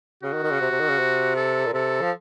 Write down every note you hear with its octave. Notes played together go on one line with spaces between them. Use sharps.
C#3 F#4
D#3
D#3
C#3
C3
C3
D#3
C#3
C3
A4
A#2
C3 A4
F3